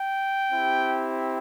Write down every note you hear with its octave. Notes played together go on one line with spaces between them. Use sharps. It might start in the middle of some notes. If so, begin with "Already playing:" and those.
Already playing: G5
C4 E4 G4